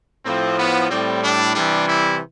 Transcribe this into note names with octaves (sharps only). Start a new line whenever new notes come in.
A2 F3 C4
B3
A2 G3 C4
D4
C3 E3 G3 D4
E4